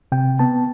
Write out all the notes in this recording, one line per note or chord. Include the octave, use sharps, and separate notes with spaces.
C3 G5
B3 A5